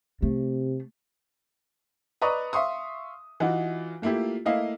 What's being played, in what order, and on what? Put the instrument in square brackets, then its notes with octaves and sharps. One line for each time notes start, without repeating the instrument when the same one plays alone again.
[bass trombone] C3 [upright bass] A3
[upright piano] B4 D5 D#5 A#5 C#6 D#6
E5 F5 C6 C#6 D#6
E3 D#4 F4 F#4
A3 A#3 E4 F4 G4
A3 A#3 E4 D#5 F5